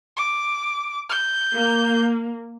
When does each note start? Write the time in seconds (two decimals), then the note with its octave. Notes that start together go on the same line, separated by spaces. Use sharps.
0.17 D6
1.10 G6
1.53 A#3